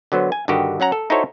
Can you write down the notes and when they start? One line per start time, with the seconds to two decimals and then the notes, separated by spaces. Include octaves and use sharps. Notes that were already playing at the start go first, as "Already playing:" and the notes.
0.12 D3 F#3 B3 C5
0.32 G#5
0.48 G2 D3 D#3 F#4 G4 D#5
0.80 F#3 C#4 F#5 A#5
0.92 A4
1.10 D#4 E4 F#4 A4 C5 C#5